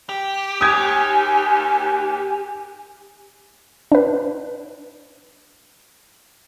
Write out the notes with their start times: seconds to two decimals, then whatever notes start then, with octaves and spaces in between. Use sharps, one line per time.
0.09 G4
0.61 D#2 G#5 D#6 G#6
3.92 D4 B4